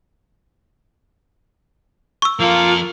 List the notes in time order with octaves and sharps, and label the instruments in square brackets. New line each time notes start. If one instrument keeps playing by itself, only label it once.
[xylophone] C#6 E6
[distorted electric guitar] F3 A4 [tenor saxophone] A#3 [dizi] F4